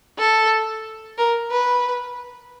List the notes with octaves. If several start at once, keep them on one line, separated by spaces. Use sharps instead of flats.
A4
A#4
B4